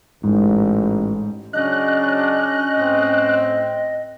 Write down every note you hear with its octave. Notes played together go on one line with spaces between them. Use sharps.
A1 G#2
C#3 F#3 C#4 D4 D#5 F#6
A2 C4